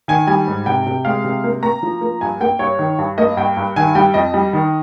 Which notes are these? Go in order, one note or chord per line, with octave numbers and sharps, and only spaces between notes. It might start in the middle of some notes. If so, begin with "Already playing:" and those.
D#3 G#5
G3 G#5
G#2
C3 G5
C3
G#3 F5
C3
A#3
A#3 A#5
F3
A#3
G2 G#5
A#3 G5
G2 C#5
D#3
G2
A#3 D#5
G2 G5
G2
D#3 G#5
G3 G5
F2 D#5
G3
D#3